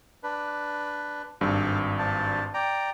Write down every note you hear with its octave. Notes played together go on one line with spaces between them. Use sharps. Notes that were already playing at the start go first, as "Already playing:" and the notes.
D4 B4
G#1 G2 A4 C5
D4 C5 A5
D5 G5 A#5